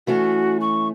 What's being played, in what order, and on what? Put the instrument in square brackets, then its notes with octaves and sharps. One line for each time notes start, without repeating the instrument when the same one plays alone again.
[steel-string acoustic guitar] E3 A3 C#4 [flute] F#4
[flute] C#6